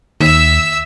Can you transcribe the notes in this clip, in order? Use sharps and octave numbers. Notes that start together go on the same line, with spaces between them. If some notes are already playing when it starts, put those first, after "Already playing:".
D#2 E5 E6